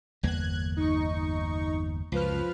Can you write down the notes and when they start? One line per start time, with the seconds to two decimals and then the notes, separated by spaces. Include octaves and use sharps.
0.23 G1 E2 A#3 F#6 G#6
0.77 D#4 C#6
2.12 C#2 F#2 F3 B4 F6